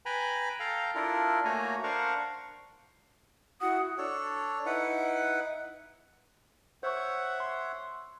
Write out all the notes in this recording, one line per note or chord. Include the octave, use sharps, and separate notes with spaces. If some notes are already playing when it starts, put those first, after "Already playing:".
B4 G5 G#5 A#5 B5
A4 F5 G5 A#5
D4 E4 F4 A4 A#4
A3 A#3 F#4 C#5 G#5 A#5
D4 A#4 C5 F5 F#5 C#6
E4 F#4 F#5 D#6
D4 A4 C#5
D#4 E4 B4 F#5
C5 C#5 E5 F#5 C#6
C6